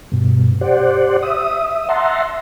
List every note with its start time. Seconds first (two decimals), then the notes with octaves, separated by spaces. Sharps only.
0.12 G2 B2
0.61 G4 C5 D5 F#5
1.22 E5 D#6
1.89 E5 F#5 A5 A#5 C6